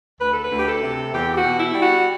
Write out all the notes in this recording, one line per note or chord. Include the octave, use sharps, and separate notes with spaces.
D2 B4
A4
B4
D2
G4
A4
C3
E2 G4
G4
F#4
B2
E4
G3
F#4